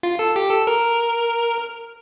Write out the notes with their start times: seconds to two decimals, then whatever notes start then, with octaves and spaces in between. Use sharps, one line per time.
0.03 F4
0.19 A4
0.36 G4
0.51 A4
0.67 A#4